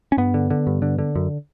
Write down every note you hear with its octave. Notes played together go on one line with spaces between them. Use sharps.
C#4
G2 B3
D3
D3
G2
D3
D3
F#2